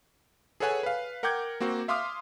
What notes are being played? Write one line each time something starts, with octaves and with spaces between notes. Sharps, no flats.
G#4 A4 B4 C#5 F#5 G#5
B4 F5
A#4 F#5 G5 D6 G6 G#6
A#3 C4 F#4
E5 F5 C6 D6 D#6 F6